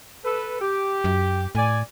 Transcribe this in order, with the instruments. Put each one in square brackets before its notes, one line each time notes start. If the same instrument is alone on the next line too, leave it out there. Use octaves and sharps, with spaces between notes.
[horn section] A4 B4
G4
[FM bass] F#2
[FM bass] A2 [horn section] D5 G#5